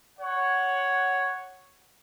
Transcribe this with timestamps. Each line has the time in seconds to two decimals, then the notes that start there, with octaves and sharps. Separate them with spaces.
0.19 C#5 F#5